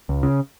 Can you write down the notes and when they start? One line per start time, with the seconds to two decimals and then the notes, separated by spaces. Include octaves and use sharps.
0.09 C#2
0.23 C#3